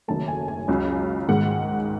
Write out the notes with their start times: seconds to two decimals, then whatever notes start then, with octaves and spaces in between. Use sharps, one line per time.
0.08 F#1 F#2 D#3 A3 A5
0.28 G#5
0.48 G#5
0.68 C#2 C#3 F#3
1.28 G#2 D#3 G#3 F#5